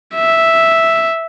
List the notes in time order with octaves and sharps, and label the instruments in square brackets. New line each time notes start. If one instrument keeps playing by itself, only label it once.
[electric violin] E5